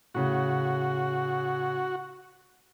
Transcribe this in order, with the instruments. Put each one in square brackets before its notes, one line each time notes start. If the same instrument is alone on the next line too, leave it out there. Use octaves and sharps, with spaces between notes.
[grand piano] A2 C#3 [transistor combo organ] F#4